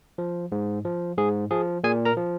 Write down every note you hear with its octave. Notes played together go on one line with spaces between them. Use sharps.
F3
G#2
F3
G#2 G#4
F3 G#4
A#2 G#4 G#5
A#4 A#5
F3